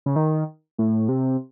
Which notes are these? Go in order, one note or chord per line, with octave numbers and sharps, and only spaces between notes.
C#3
D#3
A2
C3